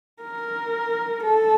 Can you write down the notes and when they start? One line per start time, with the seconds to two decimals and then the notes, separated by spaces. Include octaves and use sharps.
0.23 A#4
1.23 A4